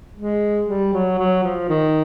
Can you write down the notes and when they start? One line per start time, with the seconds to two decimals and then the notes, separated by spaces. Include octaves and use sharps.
0.17 G#3
0.68 G3
0.93 F#3
1.18 F#3
1.43 F3
1.69 D#3